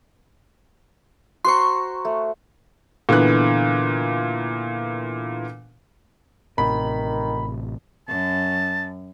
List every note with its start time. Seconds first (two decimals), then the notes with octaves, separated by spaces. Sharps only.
1.45 F#4 C5 A#5 C6 C#6
2.05 A3
3.09 A#2 D3 E3 B3 F#6
6.58 A1 A2 C3 D#3 B5
8.09 F#2 A5